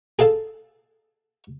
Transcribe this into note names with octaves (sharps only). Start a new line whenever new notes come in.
G#4 A4 F5 A5